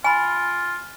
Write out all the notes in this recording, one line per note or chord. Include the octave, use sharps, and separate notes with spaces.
F4 G#5 B5